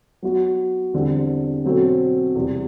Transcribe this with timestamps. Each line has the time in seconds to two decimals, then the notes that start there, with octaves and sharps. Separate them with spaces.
0.23 F#3 B3 F#4
0.94 E2 D3 G3 C4
1.65 B2 F#3 C4 F#4 A4
2.35 E2 C3 G3 C4